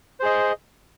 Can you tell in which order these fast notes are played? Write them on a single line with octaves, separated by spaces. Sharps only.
C5 G#4 D#5